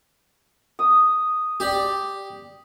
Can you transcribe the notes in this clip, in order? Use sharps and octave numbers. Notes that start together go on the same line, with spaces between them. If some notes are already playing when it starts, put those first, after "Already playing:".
D#6
G4 D5